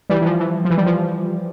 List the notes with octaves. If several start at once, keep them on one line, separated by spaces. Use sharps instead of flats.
E3 G3
E3
F3
E3
F3
E3
G3
F3